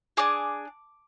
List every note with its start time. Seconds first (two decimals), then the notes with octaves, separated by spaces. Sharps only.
0.17 D4 G#4 D6